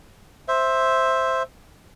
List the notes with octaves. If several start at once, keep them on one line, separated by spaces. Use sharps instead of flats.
C5 E5